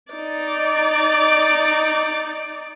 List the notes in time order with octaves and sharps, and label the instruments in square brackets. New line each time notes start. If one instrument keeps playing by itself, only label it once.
[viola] D#4 D5